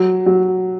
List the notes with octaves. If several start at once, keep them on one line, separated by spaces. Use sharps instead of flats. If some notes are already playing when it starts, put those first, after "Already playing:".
Already playing: F#3
F#3